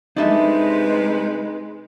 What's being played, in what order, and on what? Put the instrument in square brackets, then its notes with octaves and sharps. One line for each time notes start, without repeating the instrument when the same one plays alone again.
[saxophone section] G2 C3 B4 [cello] G#3 [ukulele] D4 A4 E5 [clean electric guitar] D#4